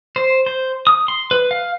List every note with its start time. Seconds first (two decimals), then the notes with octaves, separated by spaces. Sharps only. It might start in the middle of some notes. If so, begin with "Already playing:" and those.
0.16 C5
0.46 C5
0.87 D#6
1.08 C6
1.31 B4
1.51 F5